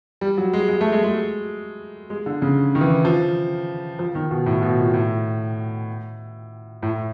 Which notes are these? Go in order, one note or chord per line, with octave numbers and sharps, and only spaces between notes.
G3
F#3
G#3
G#3
A3
G#3
G#3
G#3
D3
C#3
D#3
E3
F3
F3
D#3
B2
A2
B2
A#2
A2
A2